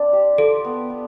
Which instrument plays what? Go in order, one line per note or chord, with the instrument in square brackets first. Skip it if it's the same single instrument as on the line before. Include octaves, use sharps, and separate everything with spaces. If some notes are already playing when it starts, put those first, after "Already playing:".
Already playing: [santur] C4 D4 D5
G4
[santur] F4 [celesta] A4
[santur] B3
B3